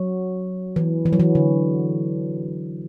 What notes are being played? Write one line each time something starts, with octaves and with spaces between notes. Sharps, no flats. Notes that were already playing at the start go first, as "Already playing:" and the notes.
Already playing: F#3
E3
E3
F#3
E3
D3